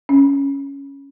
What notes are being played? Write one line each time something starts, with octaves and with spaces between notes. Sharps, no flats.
C#4